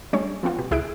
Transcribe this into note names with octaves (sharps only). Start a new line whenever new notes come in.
G3 A3 C#4 D4 C#5
F3 B3 C4 F4 F#4
B2 G4
C#2 E4 G#4 E5 F#6 D7